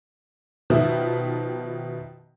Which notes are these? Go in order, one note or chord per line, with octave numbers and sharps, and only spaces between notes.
B2 D#3 F3 B3 E4